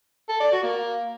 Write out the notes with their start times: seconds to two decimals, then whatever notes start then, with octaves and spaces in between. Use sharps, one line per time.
0.29 A4
0.41 D5
0.52 F#4
0.64 A#3